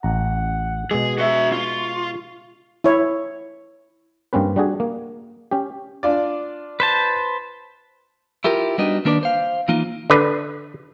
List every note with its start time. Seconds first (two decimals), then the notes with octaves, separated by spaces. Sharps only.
0.03 A1 F#5 A#5
0.91 B2 G#3 G#4
1.18 F#4 E5 C#6
1.52 F4
2.84 E4 C#5
4.33 G2 A#3 C4 C#4 B4
4.56 G3 D4 F#4 G#4
4.80 A#3
5.51 C#4 G4
6.03 D4 F4 D5
6.80 B4 C5 A5
8.44 E4 F4 G4 A#4
8.78 G3 B3 D4 D#4 F#4 D#5
9.05 D#3 A#3 D4 B4 C5 D5
9.23 C5 F5
9.68 E3 A#3 D#4 F4
10.10 D3 B4